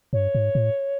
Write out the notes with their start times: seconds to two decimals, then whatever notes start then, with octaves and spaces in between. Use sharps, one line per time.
0.13 G2 C#5
0.35 G#2
0.55 A2